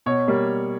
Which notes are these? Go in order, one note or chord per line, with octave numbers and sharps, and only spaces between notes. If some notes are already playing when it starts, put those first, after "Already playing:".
B2 C#5
G3 A#3